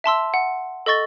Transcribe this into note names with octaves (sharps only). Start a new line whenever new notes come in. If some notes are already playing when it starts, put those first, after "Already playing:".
E5 A5 C6 E6
F#5
A4 D#5 C#6 A6 G7